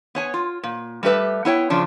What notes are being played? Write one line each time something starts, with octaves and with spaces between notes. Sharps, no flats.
B3 C#5 G#5
F4
A#2
G3 A3 G4 B4 E5
B3 E4 C#5 G5
C#3 F3 D4